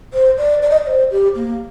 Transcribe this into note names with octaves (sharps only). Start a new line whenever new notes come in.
C5
D5
D5
D#5
D5
C5
G4
A#3